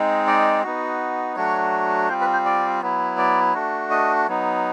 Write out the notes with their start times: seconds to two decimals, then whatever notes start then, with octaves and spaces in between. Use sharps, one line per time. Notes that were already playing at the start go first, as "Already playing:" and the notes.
Already playing: G#3 C4 D#4
0.27 D5
0.63 B3 D#4 F#4
1.36 F#3 A3 D4 F#4 C#5
2.09 G3 C4 F4 C5
2.21 B4
2.33 C5
2.45 D5
2.82 F#3 B3 E4
3.18 D5
3.54 A3 D4 F#4
3.91 D#5
4.28 F#3 B3 D#4